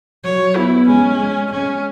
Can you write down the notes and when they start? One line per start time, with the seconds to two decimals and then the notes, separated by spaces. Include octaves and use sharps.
0.24 F#3 C#5
0.56 B3 E4
0.88 G#3 C#4
1.20 G#3
1.52 G#3 C#4